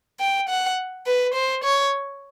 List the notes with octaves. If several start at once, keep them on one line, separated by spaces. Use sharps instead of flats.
G5
F#5
B4
C5
C#5